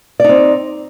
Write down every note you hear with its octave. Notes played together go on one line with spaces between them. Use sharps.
C4 D#4 D5